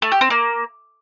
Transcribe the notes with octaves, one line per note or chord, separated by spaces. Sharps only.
A3
G4
C4
A#3